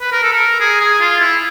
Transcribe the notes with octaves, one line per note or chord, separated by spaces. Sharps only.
B4
A#4
A4
A#4
G#4
G#4
F4
E4